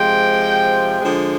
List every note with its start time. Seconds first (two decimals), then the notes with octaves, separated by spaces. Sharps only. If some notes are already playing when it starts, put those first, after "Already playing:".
Already playing: C3 F3 G#3 G5
1.01 D3 F3 G#3